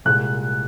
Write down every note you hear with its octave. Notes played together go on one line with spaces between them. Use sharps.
C2 A#2 G#3 F#6